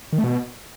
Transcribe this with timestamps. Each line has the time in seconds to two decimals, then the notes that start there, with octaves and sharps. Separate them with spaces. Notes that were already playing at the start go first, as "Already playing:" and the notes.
0.13 D#3
0.18 A3
0.24 B2